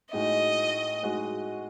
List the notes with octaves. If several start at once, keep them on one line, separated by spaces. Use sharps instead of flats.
A2 G#3 D#4 F#4 D#5
A2 G#3 D#4 F#4